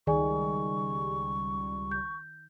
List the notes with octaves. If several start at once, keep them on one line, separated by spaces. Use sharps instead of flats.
C#2 D#3 G3 G#4 D5 G#5 C#6
G6